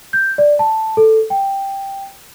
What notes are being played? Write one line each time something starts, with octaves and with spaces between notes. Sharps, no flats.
G6
D5
A5
A4
G5